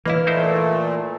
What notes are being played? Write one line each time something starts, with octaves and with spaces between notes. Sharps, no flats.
E3 A#3 E4 B4 D#5 F5
A#2 A3 D#4 E4 C5